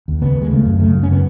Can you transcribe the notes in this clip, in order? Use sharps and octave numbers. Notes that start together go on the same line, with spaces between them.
D#2
C#3 B3
D#2
G#3
C#3 A3
F#2
C#3 A3
F#2
C#4
C#3 B3